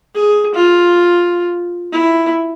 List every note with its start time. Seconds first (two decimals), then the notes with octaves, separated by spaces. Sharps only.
0.15 G#4
0.54 F4
1.92 E4